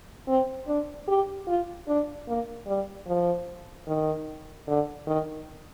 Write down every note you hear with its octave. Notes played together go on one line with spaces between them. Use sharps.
C4
D4
G4
F4
D4
A#3
G3
F3
D#3
D3
D#3